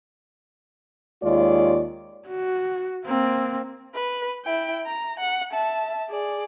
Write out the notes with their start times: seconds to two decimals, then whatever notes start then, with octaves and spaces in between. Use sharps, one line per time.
1.23 D#2 G#3 F4 C#5 D5
2.27 F#4
3.05 A#3 C4
3.94 B4
4.45 E4 G5
4.86 A#5
5.20 F#5
5.52 E5 A5
6.09 G#4 D5